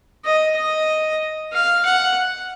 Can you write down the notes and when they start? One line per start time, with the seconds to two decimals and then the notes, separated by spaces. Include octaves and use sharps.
0.25 D#5
0.56 D#5
1.53 F5
1.85 F#5